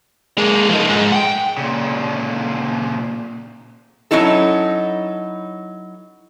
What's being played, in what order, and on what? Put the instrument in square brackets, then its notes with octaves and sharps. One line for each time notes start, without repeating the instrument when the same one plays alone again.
[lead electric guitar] G#3 A#3
F3 D#4
G#2
F#5 G5
[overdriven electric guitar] A#2 C#3
[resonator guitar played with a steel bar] F#3 G3 C#4 D#4 E4 A4